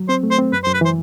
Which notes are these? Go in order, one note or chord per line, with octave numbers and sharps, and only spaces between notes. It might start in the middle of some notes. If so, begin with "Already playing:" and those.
Already playing: F#3
C4 C5
A3
C5
C4
F#2 B4
C5
F#2
B4
E3 C5